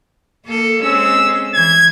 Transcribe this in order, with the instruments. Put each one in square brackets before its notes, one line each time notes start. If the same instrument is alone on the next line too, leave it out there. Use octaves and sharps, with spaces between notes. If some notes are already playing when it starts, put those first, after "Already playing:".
[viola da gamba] A#3 A4
[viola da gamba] G#3 C4 C#4 [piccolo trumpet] E6
[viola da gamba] E3 [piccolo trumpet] G#6